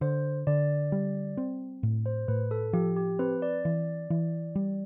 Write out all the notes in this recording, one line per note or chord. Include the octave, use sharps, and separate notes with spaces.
D3 C5
D3 D5
G3
C4
A2
C5
A2 B4
A4
F3 G4
G4
C4 B4
D5
E3
E3
G3